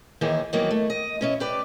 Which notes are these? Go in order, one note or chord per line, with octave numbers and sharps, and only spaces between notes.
D#2 D#3 E3 E4 G#4
D#3 E3 F#3 G3 A#3 B3
A3
D#5
B2 C#4 E4
G4 B4 D5